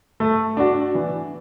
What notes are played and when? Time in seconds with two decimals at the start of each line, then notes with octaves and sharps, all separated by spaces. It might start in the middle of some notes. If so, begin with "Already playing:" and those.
0.20 A3
0.57 D4 F#4
0.95 E3